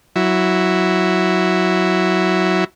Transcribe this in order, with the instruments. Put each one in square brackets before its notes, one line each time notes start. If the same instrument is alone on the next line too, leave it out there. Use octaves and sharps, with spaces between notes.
[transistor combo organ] F#3 E4